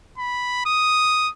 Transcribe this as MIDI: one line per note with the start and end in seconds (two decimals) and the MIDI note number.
0.18 0.64 83
0.66 1.30 87